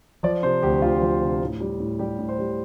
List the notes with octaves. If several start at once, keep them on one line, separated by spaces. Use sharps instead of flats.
F3 D5
C3 C5
D2 G4
D2 F4
F3
C3
A2
G3
A2
G3 G4
A2
C5
G3